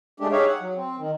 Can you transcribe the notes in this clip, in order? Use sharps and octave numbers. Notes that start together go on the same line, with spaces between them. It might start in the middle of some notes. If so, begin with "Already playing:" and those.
G#3 A3 D4 G4
D#4 G4 G#4 C#5 E5 F5
F#5
F#3
C4
D#3